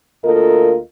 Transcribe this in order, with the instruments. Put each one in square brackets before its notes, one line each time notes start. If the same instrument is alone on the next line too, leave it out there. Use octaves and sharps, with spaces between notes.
[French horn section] D2 A#3 F4 A4 A#4 D#5